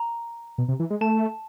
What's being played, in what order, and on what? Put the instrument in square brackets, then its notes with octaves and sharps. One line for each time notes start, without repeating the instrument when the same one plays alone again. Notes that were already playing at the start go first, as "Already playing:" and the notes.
Already playing: [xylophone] A#5
[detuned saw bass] B2
C3
E3
G#3
[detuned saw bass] A3 [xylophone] A5